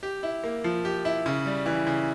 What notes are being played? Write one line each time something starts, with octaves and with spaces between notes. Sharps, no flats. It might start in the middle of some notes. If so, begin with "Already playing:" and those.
G4
E4
A#3
F3
G4
E4
C#3
G3
E3
C#3